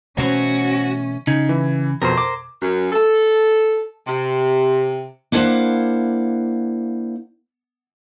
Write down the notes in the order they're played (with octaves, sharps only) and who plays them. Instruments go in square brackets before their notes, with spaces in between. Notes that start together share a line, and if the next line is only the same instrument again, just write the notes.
[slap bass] B2 E3 A3 [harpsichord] F#3 C5 [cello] C#4 [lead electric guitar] F#4
[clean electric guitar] C#3 [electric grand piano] D#4 G#6
[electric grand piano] E3
[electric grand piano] F2 B2 [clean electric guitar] A#4 C5
[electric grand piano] D6
[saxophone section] F#2
A4
C3
[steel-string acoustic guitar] A#3 D4 E4 C5 F5 F#5